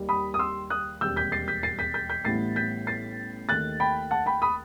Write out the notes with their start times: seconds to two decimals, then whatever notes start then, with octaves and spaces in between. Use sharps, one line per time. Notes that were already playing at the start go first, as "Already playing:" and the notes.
Already playing: D#2 D#3 G3
0.09 B5 D#6
0.34 D#6
0.39 C6 E6
0.70 D#6 F#6
1.01 E1 D#2 D#3 G3 C4 E6 G6
1.17 G6 B6
1.32 A6 C7
1.48 G6 B6
1.63 A6 C7
1.79 G6 B6
1.94 G6 B6
2.10 G6 B6
2.25 A1 A2 G3 B3 E4 A6 C7
2.56 G6 B6
2.87 A6 C7
3.49 D#2 D#3 A3 F#6 A6
3.80 G5 B5
4.11 F#5 A5
4.26 G5 B5
4.42 B5 D#6